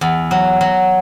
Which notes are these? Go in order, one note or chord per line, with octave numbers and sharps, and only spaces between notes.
E2
F#3
F#3